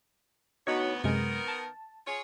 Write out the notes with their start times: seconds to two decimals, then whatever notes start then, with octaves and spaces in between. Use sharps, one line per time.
0.67 D2 B3 D#4 F#4 C#5
1.04 F#2 C3 D#3 G#3 B3 A#4
1.48 A5
2.06 F4 G#4 C#5